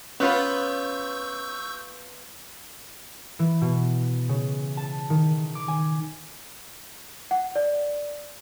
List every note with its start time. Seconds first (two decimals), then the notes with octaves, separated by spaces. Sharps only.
0.20 B3 C#4 F4 B4 C#6 E6 G6
3.39 E3
3.61 B2
4.29 C#3
4.77 A5
5.10 D#3
5.55 D6
5.68 G#5
7.31 F#5
7.56 D5